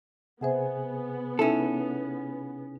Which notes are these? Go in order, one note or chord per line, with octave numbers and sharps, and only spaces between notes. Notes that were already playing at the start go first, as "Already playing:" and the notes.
C3 B3 G#4 C5 E5 F#5 G#5
C#4 D#4 E4 A4 E5